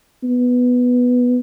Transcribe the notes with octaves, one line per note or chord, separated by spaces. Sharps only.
B3